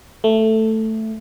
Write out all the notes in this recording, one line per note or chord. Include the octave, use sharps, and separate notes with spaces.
A3